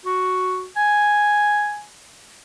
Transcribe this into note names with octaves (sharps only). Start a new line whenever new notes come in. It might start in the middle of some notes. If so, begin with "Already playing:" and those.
F#4
G#5